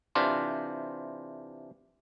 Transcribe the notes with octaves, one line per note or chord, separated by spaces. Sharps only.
C3 E3 D4 F4 C5